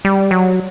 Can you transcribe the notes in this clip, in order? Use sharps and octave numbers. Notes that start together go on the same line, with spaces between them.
G3
F#3